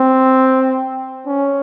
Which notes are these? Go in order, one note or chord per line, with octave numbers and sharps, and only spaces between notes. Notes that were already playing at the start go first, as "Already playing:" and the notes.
Already playing: C4
C#4